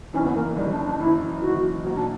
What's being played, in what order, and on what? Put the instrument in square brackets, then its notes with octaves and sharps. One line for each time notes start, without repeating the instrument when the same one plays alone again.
[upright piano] F#1 F#2 E3 [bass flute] C#4
[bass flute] B3
A#3
[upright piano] F#1 F#2 E3 [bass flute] G3
[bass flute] D4
D4
[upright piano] F#1 F#2 E3 [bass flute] E4
[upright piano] F#1 F#2 E3 [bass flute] F#4
[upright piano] B1 B2 A#3 [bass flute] F#4
[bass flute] D4